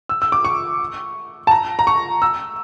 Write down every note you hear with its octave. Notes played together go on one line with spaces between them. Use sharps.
E6
E6
D6
C#6
A5
A#5
A#5
C#6
E6